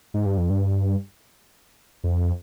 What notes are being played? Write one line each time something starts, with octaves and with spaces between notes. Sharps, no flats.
G#2
G2
F2
G2
F2